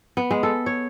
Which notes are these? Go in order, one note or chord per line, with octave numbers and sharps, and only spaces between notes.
B3
G#3
A4
C#5